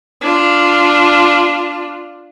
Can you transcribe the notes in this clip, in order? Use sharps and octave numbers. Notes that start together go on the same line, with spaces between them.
D4 F4